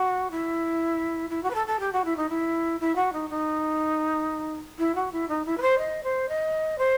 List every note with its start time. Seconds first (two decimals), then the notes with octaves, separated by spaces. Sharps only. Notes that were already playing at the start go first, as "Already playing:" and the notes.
Already playing: F#4
0.31 E4
1.30 E4
1.43 F#4
1.50 B4
1.55 A4
1.67 A4
1.80 G4
1.93 F#4
2.05 E4
2.17 D#4
2.29 E4
2.80 E4
2.96 F#4
3.13 D#4
3.30 D#4
4.79 E4
4.95 F#4
5.12 E4
5.28 D#4
5.45 E4
5.57 B4
5.62 C5
5.78 D#5
6.03 C5
6.29 D#5
6.78 C5